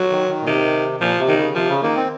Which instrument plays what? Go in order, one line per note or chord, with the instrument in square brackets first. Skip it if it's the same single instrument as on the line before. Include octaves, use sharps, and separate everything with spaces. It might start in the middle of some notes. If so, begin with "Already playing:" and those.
Already playing: [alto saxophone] F#3
[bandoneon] D#3
D#3
A#2
[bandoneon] C3 [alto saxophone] D#3
[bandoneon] A#2 [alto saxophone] F3
[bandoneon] C3
[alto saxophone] D#3
[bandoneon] C#3
[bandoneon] C3 [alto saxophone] F3
[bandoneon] C#3
[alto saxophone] D#3 [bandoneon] A#3
[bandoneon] C4